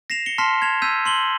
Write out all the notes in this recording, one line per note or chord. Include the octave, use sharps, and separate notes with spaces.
A#6 C7 E7 F7
C#7 G7
A5 C6 F6 B6 C7
G#6 E7 F7
E6 G6 B6 D#7
C6 F#7 G7